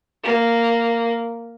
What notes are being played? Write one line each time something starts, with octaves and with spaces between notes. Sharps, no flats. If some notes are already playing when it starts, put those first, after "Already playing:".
A#3